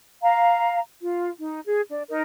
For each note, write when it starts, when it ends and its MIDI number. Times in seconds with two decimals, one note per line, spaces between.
0.22 0.79 77
0.22 0.79 82
1.01 1.30 65
1.39 1.60 63
1.66 1.81 68
1.90 2.03 62
2.09 2.22 63
2.09 2.22 70